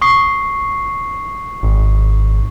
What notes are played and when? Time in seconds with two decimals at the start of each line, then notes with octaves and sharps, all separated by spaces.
0.02 C#6 D#6 C7
1.63 G#1